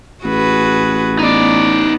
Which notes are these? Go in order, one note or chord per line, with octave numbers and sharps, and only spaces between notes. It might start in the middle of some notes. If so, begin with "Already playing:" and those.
A1 F#4 G#4 B4
B3 D#4 D5